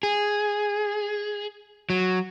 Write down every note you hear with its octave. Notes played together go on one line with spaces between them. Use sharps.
G#4
F#3